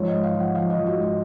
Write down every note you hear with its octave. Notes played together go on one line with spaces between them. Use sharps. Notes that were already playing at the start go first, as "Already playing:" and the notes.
Already playing: G#2 F3 C#5
D#5
G#2
F5
F3
F#5
F3 F5
D#5
F3
F#4
G#2
F4